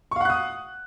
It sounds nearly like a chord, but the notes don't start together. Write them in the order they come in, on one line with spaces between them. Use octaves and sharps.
C#6 F5 F#5 F#6 D#6